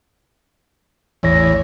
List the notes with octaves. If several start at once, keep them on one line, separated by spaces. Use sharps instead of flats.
A1 E2 C#5 A#6